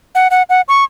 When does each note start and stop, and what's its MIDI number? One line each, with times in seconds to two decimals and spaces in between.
0.15 0.28 78
0.31 0.43 78
0.50 0.61 78
0.68 0.84 85